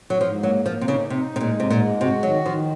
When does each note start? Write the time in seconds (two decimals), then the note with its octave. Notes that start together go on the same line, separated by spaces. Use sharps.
0.10 F#3
0.20 G#2 F3
0.43 F#3 A#3
0.66 F3 A#3
0.81 C3
0.88 C#3 D#4
1.10 C3 D#4
1.34 C3 G#3
1.41 A#2
1.56 G#2 C3
1.70 A#2
1.79 G#3
2.00 C3 F#4
2.23 D#3 F#3
2.45 D#3 F3